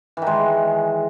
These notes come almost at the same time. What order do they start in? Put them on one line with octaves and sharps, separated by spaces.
E3 D#3 G#3